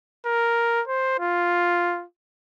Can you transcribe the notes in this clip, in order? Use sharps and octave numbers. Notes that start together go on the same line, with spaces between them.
A#4
C5
F4